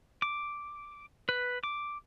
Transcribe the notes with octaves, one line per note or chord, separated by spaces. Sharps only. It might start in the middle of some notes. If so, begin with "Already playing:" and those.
D6
B4
D6